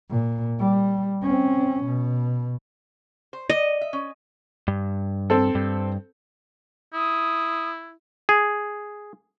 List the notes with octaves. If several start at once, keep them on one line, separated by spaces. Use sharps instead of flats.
A#2
G3
C4 C#4
B2
C5
D5 D#5
E5
C#4
G2
C4 A4
G2
E4 D#6
G#4